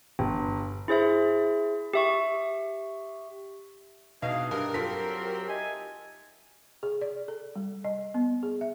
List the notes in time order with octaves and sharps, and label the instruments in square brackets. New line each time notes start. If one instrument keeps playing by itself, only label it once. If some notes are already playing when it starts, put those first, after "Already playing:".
[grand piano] G1
[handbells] E4 G#4 C5 E5
G4 E5 C#6
[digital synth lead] B2 [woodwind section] E3 D4 G#4 [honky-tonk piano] D#4 [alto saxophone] F5
[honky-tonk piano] G2 [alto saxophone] G4 [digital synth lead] A#4
[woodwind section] F#3 C4 [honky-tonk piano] F4 A4 B6
[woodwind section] D#4 E5 G#5
[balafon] G#4
D5
A4
G3
D#5
B3
G#4
E5